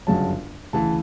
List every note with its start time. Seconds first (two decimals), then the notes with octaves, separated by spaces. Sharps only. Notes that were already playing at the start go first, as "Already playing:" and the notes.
0.07 G1 F#2 C#3 F#3 A5
0.73 D2 C#3 E3 A5